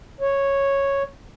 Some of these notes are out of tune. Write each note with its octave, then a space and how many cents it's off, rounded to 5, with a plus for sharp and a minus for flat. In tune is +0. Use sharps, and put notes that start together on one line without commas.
C#5 -5